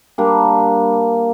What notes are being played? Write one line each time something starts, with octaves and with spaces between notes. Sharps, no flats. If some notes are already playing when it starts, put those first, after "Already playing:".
G3 A#3 D4